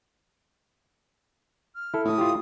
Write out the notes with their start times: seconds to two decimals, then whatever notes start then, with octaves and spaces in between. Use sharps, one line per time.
1.75 F6
1.94 E4 A4
2.05 A2 D#6
2.18 F4 G4